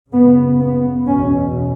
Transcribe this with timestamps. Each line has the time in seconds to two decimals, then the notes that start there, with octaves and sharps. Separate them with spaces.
0.12 F#2 C#3 B3
0.60 B3
1.07 E2 B2 C#4